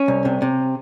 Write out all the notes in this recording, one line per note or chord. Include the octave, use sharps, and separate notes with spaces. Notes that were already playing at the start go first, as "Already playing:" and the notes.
Already playing: C#4
C2
C3
C3